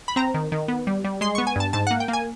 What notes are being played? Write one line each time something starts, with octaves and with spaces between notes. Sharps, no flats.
B5
C4 A#5
D#3
D#3
B3
G3
G3
G#3 C6
B3 C#6
G#5
G2 A5
G#2 A5
A#3 F#5
G5
A#3
G#5